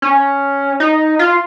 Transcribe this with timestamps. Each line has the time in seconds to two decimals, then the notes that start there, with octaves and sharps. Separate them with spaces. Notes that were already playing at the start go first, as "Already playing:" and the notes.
0.02 C#4
0.80 D#4
1.19 F4